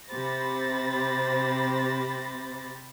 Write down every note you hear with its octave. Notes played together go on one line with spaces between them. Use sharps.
C3 G4 C5 B5 A6 A#6